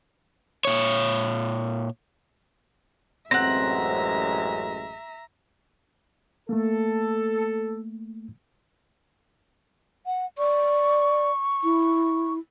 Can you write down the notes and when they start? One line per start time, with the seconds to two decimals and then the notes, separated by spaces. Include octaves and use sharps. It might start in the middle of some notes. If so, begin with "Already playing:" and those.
0.65 A#2 C#5
3.31 A1 F#2 G#3 C4 E5 F#5 A#5 A#6
6.49 A3 A#3 A4
10.06 F#5
10.38 D5 C#6
11.64 E4